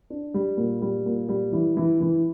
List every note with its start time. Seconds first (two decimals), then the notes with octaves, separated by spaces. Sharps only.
0.10 D4
0.34 G3
0.57 A#2
0.82 G3
1.06 A#2
1.29 G3
1.52 E3
1.77 E3
2.01 E3